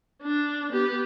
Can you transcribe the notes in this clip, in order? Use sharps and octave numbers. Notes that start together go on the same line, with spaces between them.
D4
B3 G4